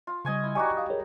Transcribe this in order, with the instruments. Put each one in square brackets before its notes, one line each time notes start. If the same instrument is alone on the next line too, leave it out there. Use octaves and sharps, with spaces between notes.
[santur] F4
[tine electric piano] C#3 G3 [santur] D#5 G#5 C#6
[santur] E4
[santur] G3 D#4 F#4 [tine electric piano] G#5 C#6 D6
[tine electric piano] F5 D#6
G#4 A#4 C#5